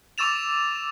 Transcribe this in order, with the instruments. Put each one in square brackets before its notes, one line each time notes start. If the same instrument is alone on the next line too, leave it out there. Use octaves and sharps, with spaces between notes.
[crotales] C#6 D6 E6 A6 E7 F7